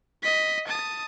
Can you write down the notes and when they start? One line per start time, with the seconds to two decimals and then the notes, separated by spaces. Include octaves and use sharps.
0.22 D#5 B6
0.67 A5 D#6